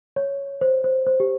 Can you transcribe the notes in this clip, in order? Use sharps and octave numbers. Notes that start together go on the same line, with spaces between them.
C#5
C5
C5
C5
G4